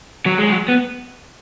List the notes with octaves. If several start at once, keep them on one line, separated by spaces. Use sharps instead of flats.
F#3
G#3
F#3
B3